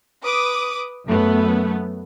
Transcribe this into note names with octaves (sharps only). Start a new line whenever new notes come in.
B4 D6 D#6
F#2 A3 B3